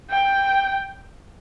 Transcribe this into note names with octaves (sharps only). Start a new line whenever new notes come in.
G5